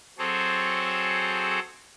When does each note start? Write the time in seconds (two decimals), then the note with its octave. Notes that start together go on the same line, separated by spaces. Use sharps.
0.18 F#3 C4 G#4 A4 C5 C#5